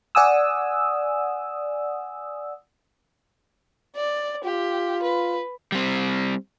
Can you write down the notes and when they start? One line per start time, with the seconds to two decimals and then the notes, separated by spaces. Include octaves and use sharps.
0.15 D5 F#5 G#5 D#6 E6
3.96 D5
4.45 F4 G4
5.03 B4
5.72 G3 C4